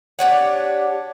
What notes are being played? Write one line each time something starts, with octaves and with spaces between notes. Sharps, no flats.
D4 G4 C#5 F#5